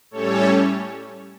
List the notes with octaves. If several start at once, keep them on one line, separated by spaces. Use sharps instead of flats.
A2 G3 C#4 A4 C#5